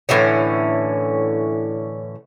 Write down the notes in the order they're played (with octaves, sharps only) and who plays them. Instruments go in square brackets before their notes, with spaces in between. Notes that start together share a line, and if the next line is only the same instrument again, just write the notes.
[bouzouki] A2 D3 E3 C#4